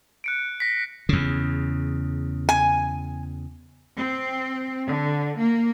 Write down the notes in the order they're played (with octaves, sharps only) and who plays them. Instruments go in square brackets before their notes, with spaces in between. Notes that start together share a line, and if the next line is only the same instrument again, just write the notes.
[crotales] F#6 C#7 D7
A#6 B6
[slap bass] E2 C#3
[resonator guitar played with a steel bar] G#5
[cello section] C4
D3
A#3